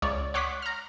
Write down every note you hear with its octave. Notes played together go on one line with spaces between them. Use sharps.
C#2 C#5 D5
C#5 F#5 C6 D6 D#6 B6
A#5 F6